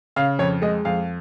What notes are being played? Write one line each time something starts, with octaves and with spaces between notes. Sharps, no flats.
C#3 F5
F2 C#5
G#3 D#5
F2 F5